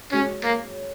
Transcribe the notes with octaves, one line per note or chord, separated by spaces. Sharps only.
G#3 C#4 F#4 C#5
A#3